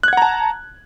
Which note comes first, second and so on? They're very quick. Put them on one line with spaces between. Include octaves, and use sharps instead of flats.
F#6 G#6 F#5 A#5 A5